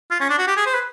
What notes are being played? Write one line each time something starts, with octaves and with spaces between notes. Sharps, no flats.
F4
C#4
D4
F#4
G4
G#4
C5
B4